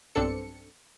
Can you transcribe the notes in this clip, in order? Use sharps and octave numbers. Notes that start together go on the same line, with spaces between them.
B1 G2 C4 D4 A4 C#7